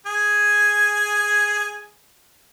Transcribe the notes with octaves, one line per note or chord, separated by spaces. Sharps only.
G#4 G#5